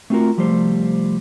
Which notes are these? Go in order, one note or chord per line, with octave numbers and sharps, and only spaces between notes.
A3 B3 C4 F4 F#4 A#4
C2 F3 G3 A3 C5